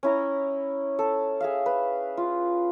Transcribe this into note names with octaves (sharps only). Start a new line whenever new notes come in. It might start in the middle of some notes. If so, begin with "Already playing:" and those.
C#4 E4 A#5
A4
G#4 E5 F5
B4
F4